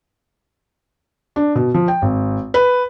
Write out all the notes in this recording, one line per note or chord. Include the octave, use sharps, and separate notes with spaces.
D4
B2
F3
G5
G#1
B4